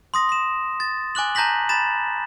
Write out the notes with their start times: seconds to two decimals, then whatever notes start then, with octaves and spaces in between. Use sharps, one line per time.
0.14 C6 D#6 A#6
0.29 C6 E7
0.80 A6
1.15 G#5 D6 F#6 F#7
1.35 A5 A#5 G6 A#6 B6 F#7
1.69 B5 A6 E7